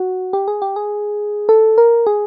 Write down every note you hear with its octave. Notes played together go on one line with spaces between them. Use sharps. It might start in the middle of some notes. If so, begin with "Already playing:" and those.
Already playing: F#4
G4
G#4
G4
G#4
A4
A#4
G#4